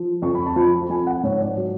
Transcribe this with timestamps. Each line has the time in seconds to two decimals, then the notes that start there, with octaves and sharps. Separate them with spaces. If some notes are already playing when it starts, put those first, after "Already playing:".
Already playing: F3
0.22 F2 C#6
0.35 B5
0.46 A5
0.56 F3 B5
0.90 F3 G#5
1.07 F#5
1.23 G#2 C#5
1.40 D5
1.57 F#3